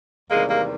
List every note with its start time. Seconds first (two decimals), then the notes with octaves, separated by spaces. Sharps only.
0.30 E2 C3 D#3 G3 G#3 A#3
0.49 G#3 A#3